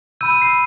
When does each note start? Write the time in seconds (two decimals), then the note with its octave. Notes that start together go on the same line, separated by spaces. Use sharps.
0.21 B5 E6 G6 D#7
0.31 D#7
0.42 C7